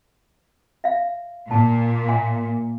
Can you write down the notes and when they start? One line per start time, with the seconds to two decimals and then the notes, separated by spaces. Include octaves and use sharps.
0.84 E5 F5
1.51 A#2 A5
2.07 E5 G#5 C6